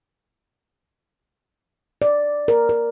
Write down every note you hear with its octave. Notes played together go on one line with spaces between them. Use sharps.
D5
A#4
A#4